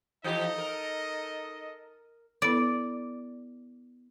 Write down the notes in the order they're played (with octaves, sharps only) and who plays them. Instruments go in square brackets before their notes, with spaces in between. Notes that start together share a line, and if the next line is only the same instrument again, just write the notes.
[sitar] E3 F3 G4 [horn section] D#4 A4 D#5
[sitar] A#4
[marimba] B3 E4 A4 [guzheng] D5